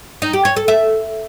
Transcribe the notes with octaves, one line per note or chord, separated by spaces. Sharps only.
D#4
G4
C#5
A4
E5